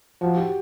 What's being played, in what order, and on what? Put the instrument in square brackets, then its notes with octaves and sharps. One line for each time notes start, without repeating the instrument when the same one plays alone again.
[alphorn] F3 [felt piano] F#4
[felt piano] G4